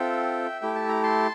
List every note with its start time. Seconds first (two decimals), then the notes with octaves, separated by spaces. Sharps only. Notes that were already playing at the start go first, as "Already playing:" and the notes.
Already playing: C4 F4 A4 E5 G5
0.61 A3 E4 G4 G5
0.75 A5
0.88 A#5
1.03 A5 C6